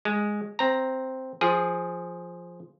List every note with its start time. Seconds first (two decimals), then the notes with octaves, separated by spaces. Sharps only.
0.05 G#3
0.59 C4 A#5
1.41 F3 G#4